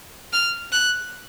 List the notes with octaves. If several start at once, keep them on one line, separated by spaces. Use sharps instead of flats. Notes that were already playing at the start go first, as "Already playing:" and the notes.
F6
F#6